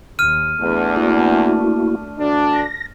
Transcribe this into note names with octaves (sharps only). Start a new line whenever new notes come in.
D#2 F6 D#7
E2 A3 D4
A#3 E4 F#4
D2 D4
A#6